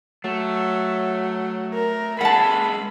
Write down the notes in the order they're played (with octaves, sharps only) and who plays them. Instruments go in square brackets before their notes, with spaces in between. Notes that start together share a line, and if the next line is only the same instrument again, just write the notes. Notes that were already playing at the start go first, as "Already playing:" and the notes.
[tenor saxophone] F#3 [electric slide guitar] A3
[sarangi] A#4
[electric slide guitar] G#3 C#4 A4 [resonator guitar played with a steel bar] F#5 A5 [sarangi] B5